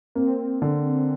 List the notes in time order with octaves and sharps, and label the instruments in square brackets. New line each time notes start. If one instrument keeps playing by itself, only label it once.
[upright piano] A#3 [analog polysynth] C4
[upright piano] D3